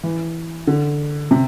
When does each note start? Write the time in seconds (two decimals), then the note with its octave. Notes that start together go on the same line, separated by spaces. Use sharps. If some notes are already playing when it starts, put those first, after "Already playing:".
0.03 E3
0.67 D3
1.31 C3